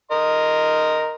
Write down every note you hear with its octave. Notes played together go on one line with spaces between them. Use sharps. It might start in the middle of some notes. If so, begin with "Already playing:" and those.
A#4 D#5 C6